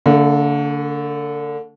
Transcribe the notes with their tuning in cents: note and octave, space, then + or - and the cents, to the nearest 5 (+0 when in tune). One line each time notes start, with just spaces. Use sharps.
D3 -25 A3 +40